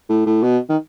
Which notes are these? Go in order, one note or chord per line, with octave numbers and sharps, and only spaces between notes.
A2
A2
B2
D#3